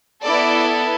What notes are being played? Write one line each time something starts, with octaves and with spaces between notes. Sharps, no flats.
B3 E4 A4 D5